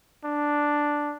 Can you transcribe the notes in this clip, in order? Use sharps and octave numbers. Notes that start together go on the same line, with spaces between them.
D4